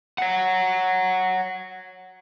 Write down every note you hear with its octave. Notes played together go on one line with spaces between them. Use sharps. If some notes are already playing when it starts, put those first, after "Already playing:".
C#5 F#5